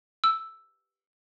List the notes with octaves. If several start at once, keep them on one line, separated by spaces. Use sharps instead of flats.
E6